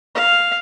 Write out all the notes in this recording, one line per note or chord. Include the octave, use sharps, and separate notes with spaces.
F5